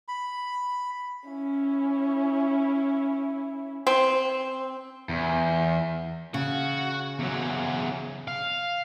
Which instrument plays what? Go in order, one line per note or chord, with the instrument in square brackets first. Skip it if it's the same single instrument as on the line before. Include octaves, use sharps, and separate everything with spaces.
[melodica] B5
[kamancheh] C#4 E4
[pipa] C4
[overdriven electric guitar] E2
[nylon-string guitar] C#3 [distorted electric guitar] F#4
[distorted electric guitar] E2 F#3
F5